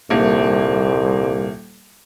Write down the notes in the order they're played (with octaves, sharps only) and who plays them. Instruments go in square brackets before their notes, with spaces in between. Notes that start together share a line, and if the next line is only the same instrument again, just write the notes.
[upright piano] D#1 A#3 [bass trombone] C2